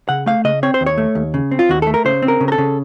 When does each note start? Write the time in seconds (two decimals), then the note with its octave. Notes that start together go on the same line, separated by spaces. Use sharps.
0.09 C#3 F#5
0.26 A3 F5
0.44 C#3 D#5
0.63 C4 C#5
0.74 C5
0.81 D#2
0.86 C#5
0.98 A3
1.15 D#2
1.34 C#3
1.51 C4
1.59 F4
1.69 D#2 F#4
1.82 A3 A4
1.94 A#4
2.05 C#3 C5
2.22 C4
2.28 A#4
2.41 C#3
2.48 A#4
2.52 A4
2.58 C#3